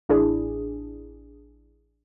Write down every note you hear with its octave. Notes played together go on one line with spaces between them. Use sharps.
A1 D4 E4 G#4